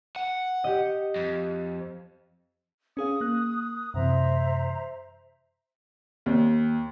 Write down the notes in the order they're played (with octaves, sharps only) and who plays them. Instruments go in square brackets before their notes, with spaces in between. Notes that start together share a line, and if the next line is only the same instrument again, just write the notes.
[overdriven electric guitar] F#5
[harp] G4 D#5
[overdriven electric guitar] F2
[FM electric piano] C#4 G#4 F5 [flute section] D#6
[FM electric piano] A#3 F#6
[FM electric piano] F#2 C3 E3 [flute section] C5 E5 A#5
[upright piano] D#2